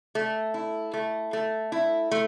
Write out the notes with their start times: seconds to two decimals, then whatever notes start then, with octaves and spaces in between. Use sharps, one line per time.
0.15 A3
0.54 E4
0.93 A3
1.33 A3
1.72 E4
2.11 A3